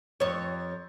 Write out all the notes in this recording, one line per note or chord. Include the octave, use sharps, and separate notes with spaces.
F2 C#5